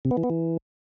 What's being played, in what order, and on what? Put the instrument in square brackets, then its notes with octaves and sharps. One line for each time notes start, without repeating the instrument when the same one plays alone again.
[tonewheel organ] C3
B3
E3
B3
E3